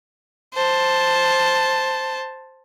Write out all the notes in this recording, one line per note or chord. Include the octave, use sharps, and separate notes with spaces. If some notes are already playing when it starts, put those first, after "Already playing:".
C5 A5